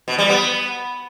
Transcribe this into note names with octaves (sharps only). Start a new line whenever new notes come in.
B2
G3
B3